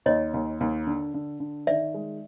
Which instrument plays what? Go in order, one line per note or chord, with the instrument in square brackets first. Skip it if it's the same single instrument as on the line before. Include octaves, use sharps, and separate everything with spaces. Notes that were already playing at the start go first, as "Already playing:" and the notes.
[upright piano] D#2 [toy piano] C#5 D#5
[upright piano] D#2
D#2
D3
D3
D3
[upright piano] D#3 [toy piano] D5 E5
[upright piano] G#3